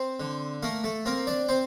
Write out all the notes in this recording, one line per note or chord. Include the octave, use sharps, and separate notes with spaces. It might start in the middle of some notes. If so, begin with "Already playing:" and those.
Already playing: C4 C5
D3
A3 A#3 A#4
A3 A4
A#3 C4 A#4
D4 D5
C4 C5